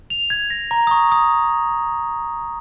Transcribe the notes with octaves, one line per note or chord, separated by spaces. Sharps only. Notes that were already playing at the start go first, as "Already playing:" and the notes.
F7
G#6
A#6
A#5
D#6
C#6
D#6